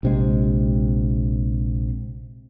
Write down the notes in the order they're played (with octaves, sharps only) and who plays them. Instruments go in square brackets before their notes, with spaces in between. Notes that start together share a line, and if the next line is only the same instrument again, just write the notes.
[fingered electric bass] A#1 C3 G#3